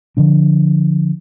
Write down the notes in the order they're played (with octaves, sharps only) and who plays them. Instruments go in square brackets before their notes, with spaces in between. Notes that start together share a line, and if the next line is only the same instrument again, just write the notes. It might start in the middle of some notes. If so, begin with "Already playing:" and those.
[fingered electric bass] D3 F3 D4